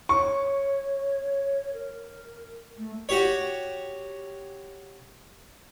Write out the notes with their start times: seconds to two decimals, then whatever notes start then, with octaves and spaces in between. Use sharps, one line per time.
0.09 C#5 C#6
1.73 A#4
2.78 A3
3.09 F#4 G4 C#5